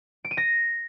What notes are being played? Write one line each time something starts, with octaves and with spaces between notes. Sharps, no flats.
D7
D#7
A#6